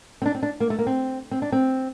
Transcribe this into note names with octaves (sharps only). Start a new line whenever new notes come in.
C4
D4
C4
D4
A#3
A3
A#3
C4
C4
D4
C4